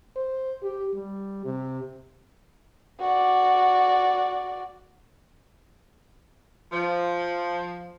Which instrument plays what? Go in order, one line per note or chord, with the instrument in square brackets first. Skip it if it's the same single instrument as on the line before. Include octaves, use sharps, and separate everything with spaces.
[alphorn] C5
G4
G3
C3
[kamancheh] F#4 D5
[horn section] F3